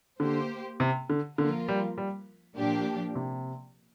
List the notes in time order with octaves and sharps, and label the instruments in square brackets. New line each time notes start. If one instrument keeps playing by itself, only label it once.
[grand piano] D3 [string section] A#3 G4 C5
[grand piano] C3
D3
[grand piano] D3 [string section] F3 A#3 F4 A#4
[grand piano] G3
G3
[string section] A#2 F3 A#3 D4 G4
[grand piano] C3